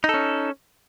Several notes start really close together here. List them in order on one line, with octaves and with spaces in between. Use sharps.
D#4 A4 C#4